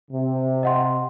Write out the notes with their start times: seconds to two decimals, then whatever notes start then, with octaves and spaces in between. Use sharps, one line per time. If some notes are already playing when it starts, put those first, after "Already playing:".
0.11 C3
0.63 D#5 F#5 C6